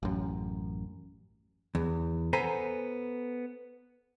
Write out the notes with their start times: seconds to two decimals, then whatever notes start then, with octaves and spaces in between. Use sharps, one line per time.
0.03 A1 F#2
1.75 E2
2.33 B3 A4 C5 G#5 A#5 B5